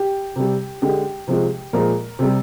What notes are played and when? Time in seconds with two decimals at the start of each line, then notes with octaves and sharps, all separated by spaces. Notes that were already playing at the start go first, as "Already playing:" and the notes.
Already playing: G4
0.36 C3 G3
0.82 D3 G#3 G4
1.27 C3 F3 G#3
1.73 A#2 F3 G#3 A#4
2.19 C3 G3